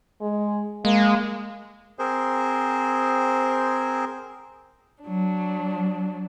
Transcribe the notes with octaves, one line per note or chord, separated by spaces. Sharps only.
G#3
G#3 A#3
C4 G#4 A#4 C5
F#3 D4